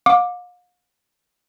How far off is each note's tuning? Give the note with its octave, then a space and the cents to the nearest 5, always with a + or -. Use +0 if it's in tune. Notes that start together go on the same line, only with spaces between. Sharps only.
F5 +40 D6 +5